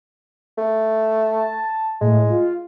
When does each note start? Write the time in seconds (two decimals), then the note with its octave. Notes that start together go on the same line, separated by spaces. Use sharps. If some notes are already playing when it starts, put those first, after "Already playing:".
0.58 A3
1.32 A5
2.01 A2 G#3
2.30 F4